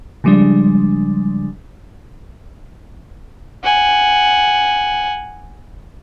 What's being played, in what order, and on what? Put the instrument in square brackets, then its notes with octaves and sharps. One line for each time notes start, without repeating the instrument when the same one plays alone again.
[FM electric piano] C#3 F3 G3 G#3 D4
[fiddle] F#5 G#5